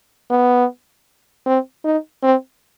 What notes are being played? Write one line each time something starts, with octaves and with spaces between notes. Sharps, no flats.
B3
C4
D#4
C4